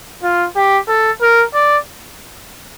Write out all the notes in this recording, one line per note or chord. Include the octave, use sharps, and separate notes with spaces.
F4
G4
A4
A#4
D5